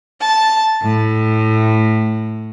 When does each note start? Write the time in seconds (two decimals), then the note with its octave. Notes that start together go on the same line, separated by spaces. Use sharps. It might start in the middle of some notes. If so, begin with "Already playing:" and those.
0.21 A5
0.81 A2